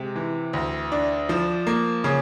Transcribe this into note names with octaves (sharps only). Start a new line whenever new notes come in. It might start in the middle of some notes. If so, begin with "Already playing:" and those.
Already playing: C3 G#3
E3
D2
D4
F3
A#3
C#3